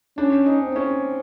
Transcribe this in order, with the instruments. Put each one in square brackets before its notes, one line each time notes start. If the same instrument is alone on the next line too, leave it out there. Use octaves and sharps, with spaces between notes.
[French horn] C#4 [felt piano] D4
[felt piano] D#4
[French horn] C4
[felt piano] C#4